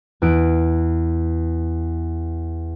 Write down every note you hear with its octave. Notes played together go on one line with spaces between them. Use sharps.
E2 E4 B4 D7 D#7